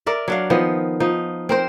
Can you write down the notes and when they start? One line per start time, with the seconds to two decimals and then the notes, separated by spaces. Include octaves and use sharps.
0.06 A#4 D5 E5
0.28 F#3 D4 F5
0.50 D#3 F3 B3
1.00 F3 D#4
1.49 C4 A#4 C5